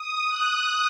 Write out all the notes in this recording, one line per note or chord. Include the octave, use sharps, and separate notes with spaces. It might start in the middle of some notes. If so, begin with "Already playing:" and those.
Already playing: D#6
F#6